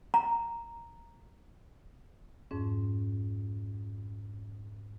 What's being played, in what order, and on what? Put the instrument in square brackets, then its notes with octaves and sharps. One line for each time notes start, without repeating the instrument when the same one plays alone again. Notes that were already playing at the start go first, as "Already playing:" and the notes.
[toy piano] A#5
[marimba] F2 G#2 C#4